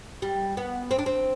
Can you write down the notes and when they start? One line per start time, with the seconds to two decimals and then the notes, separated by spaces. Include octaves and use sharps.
0.22 G3
0.57 B3
0.91 C4
0.99 D4
1.06 C4